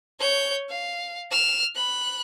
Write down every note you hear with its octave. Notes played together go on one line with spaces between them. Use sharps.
C#5 G6
F5
F6 E7
B5 F#6